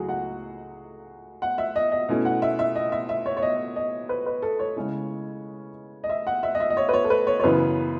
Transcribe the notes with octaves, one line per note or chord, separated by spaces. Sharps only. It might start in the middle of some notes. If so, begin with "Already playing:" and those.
Already playing: C#2 F#3 A3 E4 F#4 G#4
F#5
F#5
E5
D#5
D#5
B2 A3 C#4 E4
F#5
E5
E5
D#5
E5
E5
C#5
C#5
D#5
D#5
B4
B4
A4
C#5
C#3 G#3 C#4 E4
D#5
E5
F#5
E5
D#5
E5
D#5
C#5
B4
C#5
A4
B4
C#5
C#5
F#2 C#3 E3 B3 B4